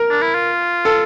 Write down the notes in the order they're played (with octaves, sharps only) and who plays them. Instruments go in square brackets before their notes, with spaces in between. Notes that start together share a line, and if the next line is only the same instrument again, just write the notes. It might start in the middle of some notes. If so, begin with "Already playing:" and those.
Already playing: [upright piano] A#4
[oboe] D4
E4
F4
[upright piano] A4